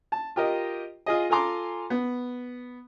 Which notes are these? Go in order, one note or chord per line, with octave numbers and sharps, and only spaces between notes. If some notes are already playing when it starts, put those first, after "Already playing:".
A5
F4 G4 A#4 D#5
F4 G#4 D#5
F4 A4 G#5 A#5 C6 D6
B3